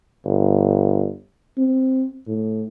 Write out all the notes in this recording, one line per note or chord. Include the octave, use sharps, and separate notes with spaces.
G1
C4
A2